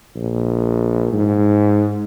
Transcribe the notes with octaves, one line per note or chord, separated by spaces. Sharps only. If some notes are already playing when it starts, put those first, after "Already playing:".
A#1
G#2